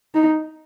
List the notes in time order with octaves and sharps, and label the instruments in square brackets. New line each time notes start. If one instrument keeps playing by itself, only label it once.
[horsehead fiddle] D#4